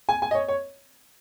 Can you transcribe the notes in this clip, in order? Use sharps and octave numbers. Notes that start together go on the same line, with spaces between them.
G#5
G#5
D#5
C#5
C#5